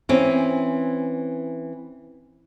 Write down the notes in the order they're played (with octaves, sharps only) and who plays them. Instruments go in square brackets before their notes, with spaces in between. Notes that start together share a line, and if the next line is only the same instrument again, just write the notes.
[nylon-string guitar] E3 C4 C#4